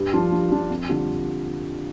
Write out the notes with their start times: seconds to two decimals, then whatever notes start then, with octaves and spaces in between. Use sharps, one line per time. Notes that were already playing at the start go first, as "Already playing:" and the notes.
Already playing: G2
0.13 F3 D4 F4
0.32 G2
0.51 F3 D4 F4
0.70 F2
0.89 D3 G3 D4 F4